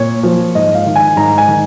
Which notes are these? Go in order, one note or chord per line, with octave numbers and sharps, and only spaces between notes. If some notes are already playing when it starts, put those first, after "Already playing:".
Already playing: A#2 C#5
F3
G#2 D#5
F5
D#3
G#5
G#2 A#5
G#5
D#3